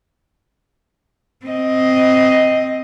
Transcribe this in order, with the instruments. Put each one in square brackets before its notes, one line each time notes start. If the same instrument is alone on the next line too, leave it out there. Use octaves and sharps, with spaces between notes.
[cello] C4 D#5